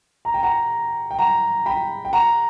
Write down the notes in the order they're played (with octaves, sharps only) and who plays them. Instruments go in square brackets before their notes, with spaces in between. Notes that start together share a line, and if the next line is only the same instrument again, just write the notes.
[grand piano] A#5
G5
F#5 A#5
G5
F#5 A#5
G5 B5
G5
F#5 A#5